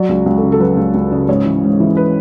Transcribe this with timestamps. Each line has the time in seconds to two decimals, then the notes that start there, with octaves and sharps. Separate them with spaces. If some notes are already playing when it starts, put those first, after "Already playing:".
Already playing: F#3 D5
0.09 C#2
0.26 C#2
0.38 A4
0.43 C#3
0.52 A4
0.59 F#3 B4
0.77 C#2
0.94 C#2
1.12 C#3
1.28 G#2 C#5
1.46 E3
1.63 G#2
1.80 E3
1.97 B4